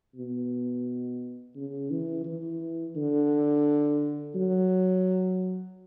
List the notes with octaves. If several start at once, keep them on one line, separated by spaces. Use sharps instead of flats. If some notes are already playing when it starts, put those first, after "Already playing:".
B2
C#3
E3
E3
D3
F#3